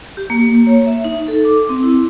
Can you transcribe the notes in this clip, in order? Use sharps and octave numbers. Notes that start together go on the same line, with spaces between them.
G4
A#3
C#5
E5
D#4
A4
D6
C4
E4